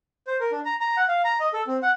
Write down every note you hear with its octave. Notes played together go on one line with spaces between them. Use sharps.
C5
A#4
D4
A#5
A#5
F#5
F5
A#5
D#5
A4
C4
F#5